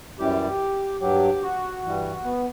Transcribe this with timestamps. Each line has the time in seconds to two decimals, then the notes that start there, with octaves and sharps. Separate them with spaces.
0.19 F#2 E3 G3 G4
1.01 G2 F#3 G4
1.43 F#4
1.83 G2 E3 G3
2.24 B3